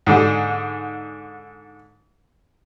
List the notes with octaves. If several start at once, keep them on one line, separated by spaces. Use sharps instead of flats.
G#2 D3